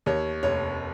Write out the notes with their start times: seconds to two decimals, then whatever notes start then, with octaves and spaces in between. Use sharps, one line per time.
0.06 D#2 C#5
0.43 F1 C#5